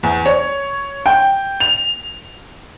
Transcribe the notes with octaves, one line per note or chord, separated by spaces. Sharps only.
E2
C#5
G5
F7